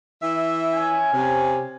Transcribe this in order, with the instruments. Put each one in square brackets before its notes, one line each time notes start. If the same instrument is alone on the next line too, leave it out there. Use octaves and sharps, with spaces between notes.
[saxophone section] E3 E5
[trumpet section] C#4 G#5
[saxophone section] C3